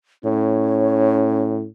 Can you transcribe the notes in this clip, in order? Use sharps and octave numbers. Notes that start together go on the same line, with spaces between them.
A2 C#4 C#5